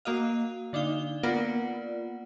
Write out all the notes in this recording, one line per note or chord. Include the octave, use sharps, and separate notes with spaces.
A#3 F#4 D#5 F5
D3 D4 D#4 F5 G7
A#3 B3 F4 A#4 D5 F#5